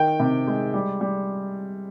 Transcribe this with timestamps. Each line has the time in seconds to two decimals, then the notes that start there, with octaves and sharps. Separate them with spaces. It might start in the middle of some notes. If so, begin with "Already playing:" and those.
Already playing: D#3 G5
0.20 C3
0.47 G#3
0.74 G3
1.01 G3